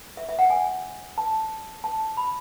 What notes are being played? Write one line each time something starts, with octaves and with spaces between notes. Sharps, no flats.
E5
E5
F#5
G#5
A5
A5
B5